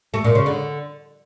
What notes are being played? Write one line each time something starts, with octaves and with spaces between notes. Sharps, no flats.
A3
A#2
C#3
D3